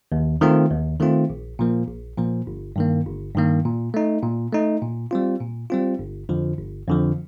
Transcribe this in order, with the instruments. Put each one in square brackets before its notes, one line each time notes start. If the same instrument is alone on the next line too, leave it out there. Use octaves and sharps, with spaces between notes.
[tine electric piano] D#2
D#3 A3 C4 F4
D#2
D#3 A3 C4 F4
A#1
A#2 F3 A#3
A#1
A#2 F3 A#3
G1
G2 D#3 A#3
G1
G2 D#3 A#3
A#2
A3 D#4
A#2
A3 D#4
A#2
G3 C4 F4
A#2
G3 C4 F4
G1
F2 D3 F3
G1
F2 D3 F3